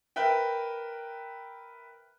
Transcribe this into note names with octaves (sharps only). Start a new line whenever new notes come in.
A#4 B4 E5 G5